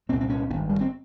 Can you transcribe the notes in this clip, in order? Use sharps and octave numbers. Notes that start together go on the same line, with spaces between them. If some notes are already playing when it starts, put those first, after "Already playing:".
C2 A#2 C4
C4
C#4
G#1 G2 C#4
G3
C4